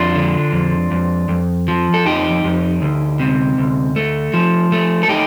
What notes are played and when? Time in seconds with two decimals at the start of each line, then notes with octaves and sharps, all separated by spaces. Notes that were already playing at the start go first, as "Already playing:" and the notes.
Already playing: F2 D4 F4
0.15 D3
0.52 F2
0.91 F2
1.29 F2
1.68 F3
1.94 A4
2.05 F2 D#4 G4
2.44 F2
2.82 D2
3.20 C3
3.58 D2
3.96 A3
4.34 F3
4.72 A3
5.03 A4
5.09 D#4 G4